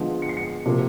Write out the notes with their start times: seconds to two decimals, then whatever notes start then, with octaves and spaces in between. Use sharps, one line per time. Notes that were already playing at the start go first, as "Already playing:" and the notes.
Already playing: D3 F3 G#3 B3
0.22 C#7
0.29 C7
0.37 C#7
0.66 C3 F3 A#3